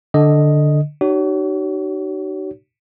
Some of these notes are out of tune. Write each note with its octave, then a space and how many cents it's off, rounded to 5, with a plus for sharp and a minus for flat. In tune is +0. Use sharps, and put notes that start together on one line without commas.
D3 +5 D#5 +0
D#4 -40 F#4 +45 C#5 +20